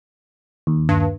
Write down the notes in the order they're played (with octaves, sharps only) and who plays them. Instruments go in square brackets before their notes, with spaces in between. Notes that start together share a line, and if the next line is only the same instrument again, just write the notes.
[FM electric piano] D#2
[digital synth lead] G2